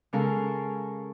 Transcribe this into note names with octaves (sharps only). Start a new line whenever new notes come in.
C#3 G#3 C#4 A4 A#4 F5